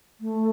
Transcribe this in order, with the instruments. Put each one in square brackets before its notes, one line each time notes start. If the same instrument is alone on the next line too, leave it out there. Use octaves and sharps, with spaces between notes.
[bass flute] A3